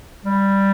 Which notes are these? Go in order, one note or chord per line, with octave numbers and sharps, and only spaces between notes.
G3